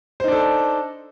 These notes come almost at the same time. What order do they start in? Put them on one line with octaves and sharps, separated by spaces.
C5 D#4 D4 A4